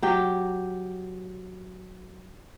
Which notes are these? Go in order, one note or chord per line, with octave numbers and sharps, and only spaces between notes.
F#3 G4